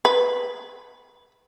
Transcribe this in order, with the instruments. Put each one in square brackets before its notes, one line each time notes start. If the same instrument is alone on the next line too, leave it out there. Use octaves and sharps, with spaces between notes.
[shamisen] B4